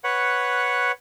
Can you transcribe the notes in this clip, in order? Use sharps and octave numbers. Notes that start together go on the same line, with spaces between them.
B4 C#5 F#5